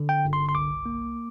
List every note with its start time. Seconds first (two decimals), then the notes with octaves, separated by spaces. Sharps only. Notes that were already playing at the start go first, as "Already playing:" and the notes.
Already playing: D3
0.09 G5
0.25 G1
0.33 C6
0.49 C6
0.55 C2 D6
0.86 A#3